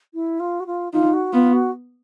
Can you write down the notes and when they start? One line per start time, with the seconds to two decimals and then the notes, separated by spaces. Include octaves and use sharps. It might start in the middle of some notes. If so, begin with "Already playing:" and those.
0.14 E4
0.40 F4
0.60 F#4
0.66 F4
0.93 D#4 F4
1.13 F#4
1.33 B3 F4
1.53 F#4